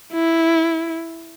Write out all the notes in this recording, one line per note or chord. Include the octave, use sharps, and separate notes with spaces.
E4